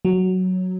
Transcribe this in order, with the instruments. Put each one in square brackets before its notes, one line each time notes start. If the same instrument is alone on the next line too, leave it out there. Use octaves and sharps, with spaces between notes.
[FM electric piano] F#3